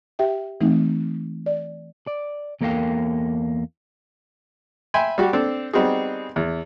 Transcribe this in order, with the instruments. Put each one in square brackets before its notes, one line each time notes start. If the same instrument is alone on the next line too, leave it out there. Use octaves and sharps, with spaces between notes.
[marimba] G4 E5 G5
E3 A3 C4 D#4
D5
[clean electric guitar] D5
E2 A#3 A4 A#4 F5 G5
[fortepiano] E5 G5 G#5 B5 C6
G3 F#4 G4
C4 D4 A4
G3 B3 C4 D#4 F#4 G#4
E2